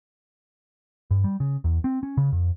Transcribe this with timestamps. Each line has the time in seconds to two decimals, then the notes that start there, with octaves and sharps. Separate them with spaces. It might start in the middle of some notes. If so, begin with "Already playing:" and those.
1.11 G2
1.24 G3
1.40 C#3
1.64 E2
1.84 C4
2.03 C#4
2.17 C#3
2.32 F2